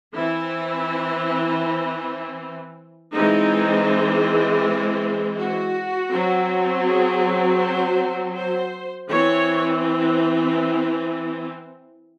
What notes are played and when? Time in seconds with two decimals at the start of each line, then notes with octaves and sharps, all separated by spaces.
0.16 E3 C4 E4
3.14 E3 G#3 C4 D#4
5.39 F#4
6.12 F#3 C4
6.87 G#4
7.61 C5
8.36 C5
9.10 E3 C4 C#5